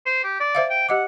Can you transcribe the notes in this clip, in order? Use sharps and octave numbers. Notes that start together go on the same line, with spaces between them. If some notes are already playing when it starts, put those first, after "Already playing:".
C5
G4
D5
C5 E5 F5
G5
G4 D#5 F#5 D6